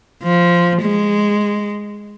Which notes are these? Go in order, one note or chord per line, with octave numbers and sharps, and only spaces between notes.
F3
G#3